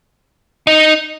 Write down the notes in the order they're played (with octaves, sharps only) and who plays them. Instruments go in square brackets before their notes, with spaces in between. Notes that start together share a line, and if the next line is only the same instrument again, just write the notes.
[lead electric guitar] D#4